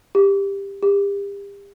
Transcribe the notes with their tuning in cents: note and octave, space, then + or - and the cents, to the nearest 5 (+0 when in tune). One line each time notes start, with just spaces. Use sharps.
G4 +15
G4 +35